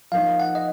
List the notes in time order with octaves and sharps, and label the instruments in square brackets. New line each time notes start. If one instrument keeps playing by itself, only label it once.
[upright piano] F3 A#3 D#4 [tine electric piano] F5
[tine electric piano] F#5
D#5